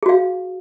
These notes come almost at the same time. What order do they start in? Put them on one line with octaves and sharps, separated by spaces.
G#4 F#4 F5